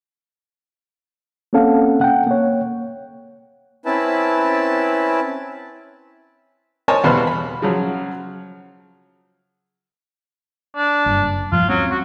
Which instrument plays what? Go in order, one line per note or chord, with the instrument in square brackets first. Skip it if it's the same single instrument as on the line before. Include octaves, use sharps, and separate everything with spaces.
[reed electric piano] A#3 C4 C#4 A4 F5 F#5
F#5 G5
A#3 C#5
[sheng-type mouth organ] C4 C#4 E4 B4 A5
[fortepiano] A#4 C5 C#5 D#5 G#5 A5
E2 B2 G3 B4 C5 F5
B5
C#3 F3 F#3
[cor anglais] D4
[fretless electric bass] F#1 G2
[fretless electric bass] D#1 G2 F3 [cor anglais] F4
[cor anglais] F#3 [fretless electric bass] G#3 C4 C#4
[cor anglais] F#4